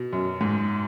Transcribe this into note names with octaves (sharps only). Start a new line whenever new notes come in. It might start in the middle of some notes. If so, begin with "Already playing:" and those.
Already playing: B2
F#2
G#2